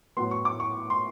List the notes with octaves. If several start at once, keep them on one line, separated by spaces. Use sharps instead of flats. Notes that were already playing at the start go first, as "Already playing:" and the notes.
A2 F#3 B3 C6
C#6
D6
C#6
C6